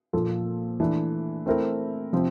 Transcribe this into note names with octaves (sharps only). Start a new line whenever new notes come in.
A#2 F3 A#3 F4 A4
E3 A3 D4
A3 C4 E4 A#4
C3 F3 C4